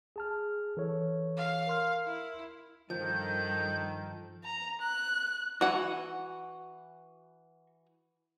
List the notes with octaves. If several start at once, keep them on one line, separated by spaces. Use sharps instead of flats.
G#4 A5 F6
E3 A4 C#5
F5
A#4 C6 F6
E4
G2 D#3 F3 A4 G6
A#5
F#6
E3 F#4 F#5 G#5